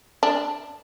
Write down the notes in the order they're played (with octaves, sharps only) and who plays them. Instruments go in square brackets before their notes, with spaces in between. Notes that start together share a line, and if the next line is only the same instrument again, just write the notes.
[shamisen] D4